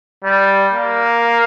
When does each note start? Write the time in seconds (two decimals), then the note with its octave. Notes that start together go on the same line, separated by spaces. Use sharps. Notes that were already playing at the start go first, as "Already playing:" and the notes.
0.24 G3
0.73 A#3